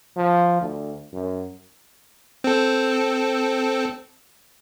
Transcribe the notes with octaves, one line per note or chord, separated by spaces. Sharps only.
F3
D2
F#2
C4 A4